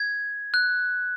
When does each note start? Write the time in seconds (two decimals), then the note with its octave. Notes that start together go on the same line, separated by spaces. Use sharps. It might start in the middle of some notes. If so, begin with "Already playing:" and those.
Already playing: G#6
0.54 F#6